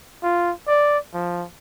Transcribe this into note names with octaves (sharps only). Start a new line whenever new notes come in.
F4
D5
F3